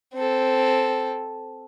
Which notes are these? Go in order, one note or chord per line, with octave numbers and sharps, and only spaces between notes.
C4 A4